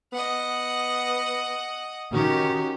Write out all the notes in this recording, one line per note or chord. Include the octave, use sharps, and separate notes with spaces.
B3 D#5 F#5
D#3 C#4 F#4 G4